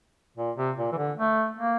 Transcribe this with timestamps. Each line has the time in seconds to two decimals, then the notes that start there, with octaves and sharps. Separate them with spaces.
0.37 A#2
0.57 C3
0.77 A#2
0.92 E3
0.98 D3
1.18 A3
1.59 A#3